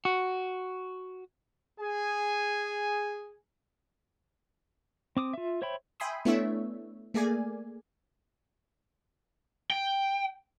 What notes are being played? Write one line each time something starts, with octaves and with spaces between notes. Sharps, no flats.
F#4
G#4 G#5
C4 D6 D#6
F4 E5
C5 C#5 E5 G5 B5
E5 G5 G#5 B5 C6 D#6
A3 B3 D4 E4 C#5 E5
A3 A#3 G#4 D5 G#5
G5